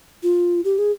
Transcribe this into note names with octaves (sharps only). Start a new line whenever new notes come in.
F4
G4
G#4